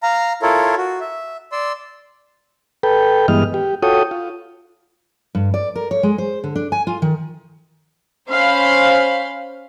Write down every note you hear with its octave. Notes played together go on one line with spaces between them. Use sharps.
F5 A#5
E4 F4 A4 A#4 C#5
F#4
E5
D5 C6 E6
A4 B4 G5
G2 E3 G#3 B3 D#5 F6
G4
F4 F#4 A4 C#5 G5 D#6
F4
G2
D5
A#4
C#5
G#3
C5
D3
D4
G#5
F4
D#3
C#4 C5 F5 B5